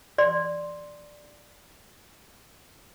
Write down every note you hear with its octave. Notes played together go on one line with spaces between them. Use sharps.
D5 C6